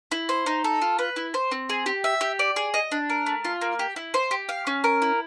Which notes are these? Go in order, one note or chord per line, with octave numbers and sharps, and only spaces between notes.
E4
C5
D#4
A4
F4
B4
E4
C5
C4
G#4
G4
E5
G4
D5
G#4
D#5
D4
A#4
A3
F4
A#3
G4
E4
C5
G4
F5
C#4
A#4
E4